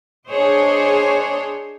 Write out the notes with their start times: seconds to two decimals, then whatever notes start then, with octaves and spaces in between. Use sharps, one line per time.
0.28 D4 G#4 C5 C#5 D#5